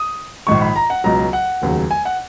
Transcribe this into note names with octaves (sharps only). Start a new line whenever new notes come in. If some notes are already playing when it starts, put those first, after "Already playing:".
Already playing: D#6
A#1 G#2 D#3 C#6
B5
A#5
F#5
C#2 B2 F#3 A#5
F#5
F1 D#2 C#3 F#3
G#5
F#5